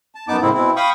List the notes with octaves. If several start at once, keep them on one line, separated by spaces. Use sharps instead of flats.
A5
F#2 B3 D#4 A5 D6
A2 C#3 G#3 A#3 C4 E4
B2 C4 E4
F5 G5 B5 C#6 D#6